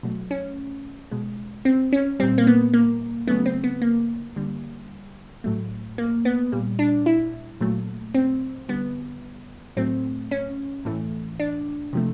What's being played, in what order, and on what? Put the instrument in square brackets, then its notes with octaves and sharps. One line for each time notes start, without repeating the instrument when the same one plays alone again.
[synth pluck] B2 F#3 A3
C#4
B2 G#3
C4
C#4
A#2 G3 C4
A#3
B3
A#3
C#3 F#3 A3 B3
C4
B3
A#3
D3 G3
A2 F#3 A3
A#3
B3
A#2 G3
D4
E4
A#2 F#3 A3
C4
D3 G3 B3
A2 F#3 A3 C4
C#4
A2 E3 A3
D4
C3 F3 A3